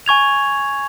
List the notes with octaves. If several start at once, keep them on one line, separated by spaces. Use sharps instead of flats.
G#5 C#6 G#6 F7